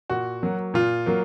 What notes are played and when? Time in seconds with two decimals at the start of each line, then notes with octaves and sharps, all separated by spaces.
0.10 A#2 F#4
0.42 F#3 A#3
0.74 A#2 F4
1.06 F#3 A#3